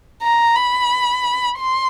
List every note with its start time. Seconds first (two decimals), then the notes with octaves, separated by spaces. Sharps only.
0.22 A#5
0.56 B5
1.59 C6